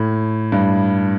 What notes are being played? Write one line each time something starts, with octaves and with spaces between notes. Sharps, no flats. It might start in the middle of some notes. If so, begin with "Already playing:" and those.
Already playing: A2
G2